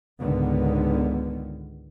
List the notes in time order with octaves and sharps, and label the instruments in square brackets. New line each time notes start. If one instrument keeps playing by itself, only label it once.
[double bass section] C#2 G#2 D3 D#3 B3